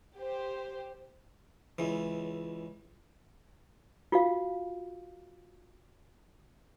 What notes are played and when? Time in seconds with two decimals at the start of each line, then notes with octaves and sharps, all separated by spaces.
0.17 G4 C5
1.78 C#2 E3
4.12 F4 F#4 F5